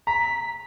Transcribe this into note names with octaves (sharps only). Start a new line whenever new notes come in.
A#5 B6